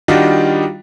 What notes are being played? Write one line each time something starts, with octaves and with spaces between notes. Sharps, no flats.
D#3 G3 D4 D#4 F4 F#4